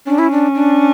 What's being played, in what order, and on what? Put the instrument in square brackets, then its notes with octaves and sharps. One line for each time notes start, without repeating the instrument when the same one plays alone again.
[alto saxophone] C#4 [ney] D4
[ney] E4
D4
D4